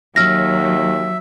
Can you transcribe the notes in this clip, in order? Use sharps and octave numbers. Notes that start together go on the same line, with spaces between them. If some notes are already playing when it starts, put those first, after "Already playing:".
D#2 F#3 E5 F6 A#6